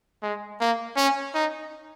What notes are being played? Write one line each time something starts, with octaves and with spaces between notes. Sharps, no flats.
G#3
A#3
C#4
D#4